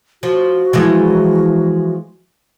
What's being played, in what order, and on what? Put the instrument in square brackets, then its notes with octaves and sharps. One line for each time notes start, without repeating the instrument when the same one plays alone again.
[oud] F3 [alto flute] F#4
[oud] E3 F3 G#3